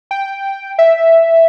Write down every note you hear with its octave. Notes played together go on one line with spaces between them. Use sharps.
G5
E5